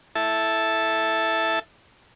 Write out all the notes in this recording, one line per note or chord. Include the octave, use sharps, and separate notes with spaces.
E4 A4 E5 A5